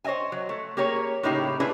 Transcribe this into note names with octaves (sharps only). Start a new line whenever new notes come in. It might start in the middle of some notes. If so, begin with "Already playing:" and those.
C5 C#5 D#5 E5 G#5
F#3
A3
A#3 G4 G#4 A#4 C#5
A2 C#3 A#3 D#4 E4 G4
A#2 D4 E4 G#4 B4